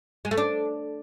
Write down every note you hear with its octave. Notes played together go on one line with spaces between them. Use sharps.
G#3
A3
D4